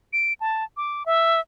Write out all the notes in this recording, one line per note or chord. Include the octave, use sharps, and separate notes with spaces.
D7
A5
D6
E5